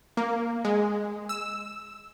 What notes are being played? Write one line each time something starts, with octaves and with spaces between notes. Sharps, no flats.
A#3
G#3
E6